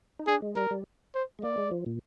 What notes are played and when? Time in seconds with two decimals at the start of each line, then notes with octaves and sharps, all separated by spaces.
0.19 D#4
0.27 D4 G#4
0.42 G#3
0.56 G3 A#4
0.71 G3
1.15 C5
1.39 G#3
1.43 A#3 D5
1.58 G#3
1.71 F3
1.86 A#2